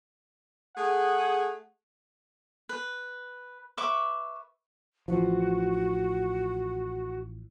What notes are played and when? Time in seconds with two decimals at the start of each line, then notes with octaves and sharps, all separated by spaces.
0.77 A3 G#4 F#5
2.69 B4
3.77 B4 E5 C#6 D6
5.08 A1 E3 F3 F#4